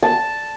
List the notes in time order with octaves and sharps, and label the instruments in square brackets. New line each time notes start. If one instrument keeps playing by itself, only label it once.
[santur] A5